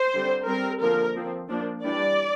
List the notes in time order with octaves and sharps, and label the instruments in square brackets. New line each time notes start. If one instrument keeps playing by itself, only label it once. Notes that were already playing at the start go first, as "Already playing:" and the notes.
Already playing: [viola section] C5
D3 G3 C4
G3 C4 A#4
D3 F3 A#3 A#4
F3 C4
F3 A#3 D4
E3 G3 D4 D5